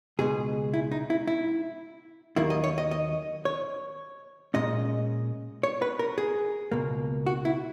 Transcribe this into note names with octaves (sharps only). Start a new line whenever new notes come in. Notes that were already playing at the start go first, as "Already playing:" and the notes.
C#2 B2 G#3 G#4
E4
D#4
E4
E4
D#2 D#3 F#3 A#3 E4
D#5
C#5
D#5
D#5
C#5
A#2 G#3 C#4 D#5
C#5
B4
A#4
G#4
C#2 B2 A#3
F#4
E4